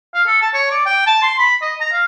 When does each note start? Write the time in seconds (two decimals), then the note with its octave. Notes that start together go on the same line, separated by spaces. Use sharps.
0.14 F5
0.27 A4
0.41 A5
0.54 C#5
0.71 D5
0.86 G5
1.07 A5
1.22 C6
1.39 B5
1.62 D#5
1.80 A#5
1.92 F5